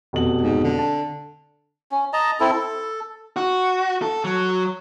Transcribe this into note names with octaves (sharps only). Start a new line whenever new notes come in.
F1 B2 F#7
G#2
D3
A5
C#4
D#5 A5 A#5
C4 E4 A4
A4
F#4
A4
F#3